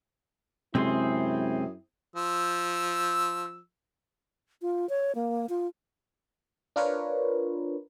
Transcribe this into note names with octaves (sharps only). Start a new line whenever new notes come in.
F#2 C3 G#3 C4 E4 G#4 C5
F3 E6
F4
C#5
A#3
F4
D4 F4 A#4 B4 C#5